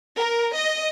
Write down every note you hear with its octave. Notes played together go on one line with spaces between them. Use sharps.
A#4
D#5